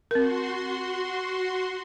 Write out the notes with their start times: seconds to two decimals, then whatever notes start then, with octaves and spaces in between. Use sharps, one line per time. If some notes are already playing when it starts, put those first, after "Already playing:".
0.11 C4 F#4 A#4 C6